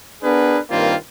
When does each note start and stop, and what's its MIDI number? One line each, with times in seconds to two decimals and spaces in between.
0.23 0.58 59
0.23 0.58 62
0.23 0.58 68
0.23 0.58 70
0.23 0.58 71
0.69 0.95 43
0.69 0.95 51
0.69 0.95 58
0.69 0.95 60
0.69 0.95 65